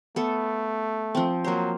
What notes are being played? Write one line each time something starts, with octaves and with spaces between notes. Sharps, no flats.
A3 B3 A4
F3 C4
F#3 A#3 C5